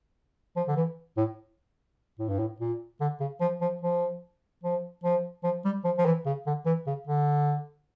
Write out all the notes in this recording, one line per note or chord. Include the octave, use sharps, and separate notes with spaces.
F3
D3
E3
A2
A2
G2
A2
A#2
D3
C#3
F3
F3
F3
F3
F3
F3
G3
F3
F3
E3
C#3
D3
E3
C#3
D3